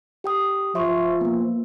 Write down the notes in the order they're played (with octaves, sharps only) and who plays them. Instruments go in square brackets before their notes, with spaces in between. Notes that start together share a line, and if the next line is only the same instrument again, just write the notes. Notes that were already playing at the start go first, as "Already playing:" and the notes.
[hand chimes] G4 G5 D#6
[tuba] F3 [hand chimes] E5 C6 C#6
[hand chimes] A#3 B3